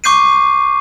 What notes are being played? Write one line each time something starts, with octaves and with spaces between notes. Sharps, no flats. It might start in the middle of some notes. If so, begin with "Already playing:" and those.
C#6 D6 G6 C7 D#7